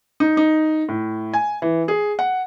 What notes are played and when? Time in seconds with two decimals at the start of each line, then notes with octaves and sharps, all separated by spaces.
0.20 D#4
0.37 D#4
0.89 A2
1.34 G#5
1.62 E3
1.88 G#4
2.19 F#5